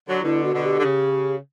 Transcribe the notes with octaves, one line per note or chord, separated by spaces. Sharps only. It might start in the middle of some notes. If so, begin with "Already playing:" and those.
D3 F#3 F#4
B2 D3 E4
F#4
B2 D3
G4
D3
C#3